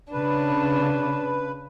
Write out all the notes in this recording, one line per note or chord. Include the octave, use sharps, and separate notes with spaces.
C#3 D4 B4